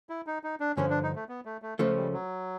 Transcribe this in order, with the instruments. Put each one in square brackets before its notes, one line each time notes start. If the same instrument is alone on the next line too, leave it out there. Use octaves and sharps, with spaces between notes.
[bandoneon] E4
D#4
D#4
D4
[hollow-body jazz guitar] G2 D3 F3 [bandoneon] C#4
[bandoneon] D4
D#4
A3
B3
A3
A3
[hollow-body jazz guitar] C#2 C#3 F3 A3 C#4 [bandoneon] G#3
[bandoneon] G3
F#3